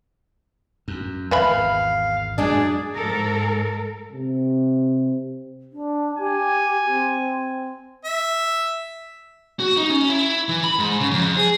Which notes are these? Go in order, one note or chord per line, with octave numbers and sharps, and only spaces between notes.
F#2
G#1 E2 B4 E5 F5 B5
F#2 G#3 D4 G#4 D5
G#2 A4 A#4
C3
D4
G4 G#5
C4
E5
F#4
D#4
C#4
E4
E3
B5
G#2
C#3
F2
G#4